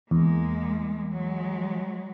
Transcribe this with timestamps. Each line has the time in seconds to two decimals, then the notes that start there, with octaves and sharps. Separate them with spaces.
0.11 E2 G#3 A#3
1.13 F#3 G#3